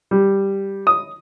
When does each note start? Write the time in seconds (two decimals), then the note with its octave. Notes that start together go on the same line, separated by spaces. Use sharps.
0.11 G3
0.87 D#6